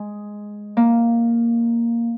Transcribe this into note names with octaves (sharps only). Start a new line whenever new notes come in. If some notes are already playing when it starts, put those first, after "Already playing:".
Already playing: G#3
A#3